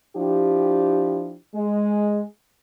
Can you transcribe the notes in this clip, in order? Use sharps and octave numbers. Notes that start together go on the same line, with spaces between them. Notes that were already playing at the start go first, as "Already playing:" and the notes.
F3 D4 E4 G4
G#3